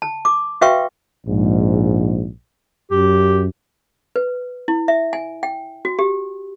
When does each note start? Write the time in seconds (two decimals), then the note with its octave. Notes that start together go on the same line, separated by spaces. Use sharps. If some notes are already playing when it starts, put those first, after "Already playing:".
0.02 A5
0.25 D6
0.61 F#4 B4 E5 F5 G5 C#6
1.27 A#1 G#2
2.91 F#2 G4
4.16 B4
4.68 E4
4.88 E5
5.13 G#5
5.43 G5
5.85 F#4
5.99 G4